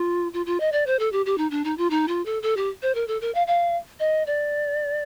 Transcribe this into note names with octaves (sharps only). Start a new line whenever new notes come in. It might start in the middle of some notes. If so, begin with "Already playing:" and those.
Already playing: F4
F4
F4
D#5
D5
C5
A4
G4
G4
D#4
D4
D#4
F4
D#4
F4
A4
A4
G4
C5
A#4
A4
A#4
F5
F5
D#5
D5